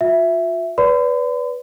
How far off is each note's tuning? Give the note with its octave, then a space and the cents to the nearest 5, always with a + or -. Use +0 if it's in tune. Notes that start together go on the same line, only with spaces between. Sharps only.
F4 +40 E5 +5
B4 +0 D5 -35 B5 +45